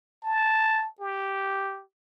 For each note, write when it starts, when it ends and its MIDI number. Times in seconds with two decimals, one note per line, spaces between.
0.24 0.89 81
1.00 1.83 67